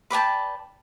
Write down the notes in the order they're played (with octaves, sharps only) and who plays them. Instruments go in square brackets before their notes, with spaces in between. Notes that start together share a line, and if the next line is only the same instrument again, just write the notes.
[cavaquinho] B4 D5 G5 A5